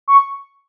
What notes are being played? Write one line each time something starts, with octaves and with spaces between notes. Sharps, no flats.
C#6